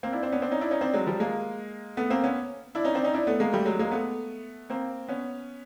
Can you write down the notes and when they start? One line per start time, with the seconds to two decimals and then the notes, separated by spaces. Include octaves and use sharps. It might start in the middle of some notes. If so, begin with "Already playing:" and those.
0.03 A#3 C4
0.13 D4 E4
0.23 C4 D4
0.32 B3 C#4
0.42 C4 D4
0.51 C#4 D#4
0.61 D4 E4
0.71 C#4 D#4
0.81 C4 D4
0.93 F#3 G#3
1.06 F3 G3
1.20 G#3 A#3
1.97 A3 B3
2.10 A#3 C4
2.24 B3 C#4
2.75 D4 E4
2.84 C#4 D#4
2.94 C4 D4
3.04 C#4 D#4
3.14 D4 E4
3.27 A3 B3
3.40 G#3 A#3
3.53 G3 A3
3.65 F#3 G#3
3.79 G#3 A#3
3.91 A3 B3
4.70 A#3 C4
5.09 B3 C#4